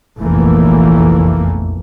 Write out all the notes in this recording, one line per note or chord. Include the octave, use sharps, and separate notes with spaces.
F1 A#1 E2 E3 A3 A#3